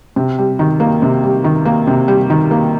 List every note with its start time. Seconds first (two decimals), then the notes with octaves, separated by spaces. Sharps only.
0.16 C3
0.38 G3
0.59 D#3
0.80 A#3
1.02 C3
1.23 G3
1.44 D#3
1.65 A#3
1.87 C3
2.08 G3
2.30 D#3
2.51 A#3